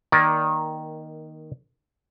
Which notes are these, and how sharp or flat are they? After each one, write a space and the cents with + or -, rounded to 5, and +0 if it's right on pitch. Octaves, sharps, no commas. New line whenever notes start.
D#3 +0 A#3 +15 D5 +0